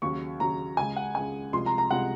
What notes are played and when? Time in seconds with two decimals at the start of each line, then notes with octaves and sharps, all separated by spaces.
0.02 D#2 C#3 F#3 C#6
0.40 D#2 C#3 F#3 A#5
0.77 C#2 C#3 G#3 G#5
0.96 F#5
1.15 C#2 C#3 G#3 G#5
1.53 C2 C3 F3 G#3 C6
1.66 A#5
1.78 A#5
1.90 C2 C3 F3 G#3 F#5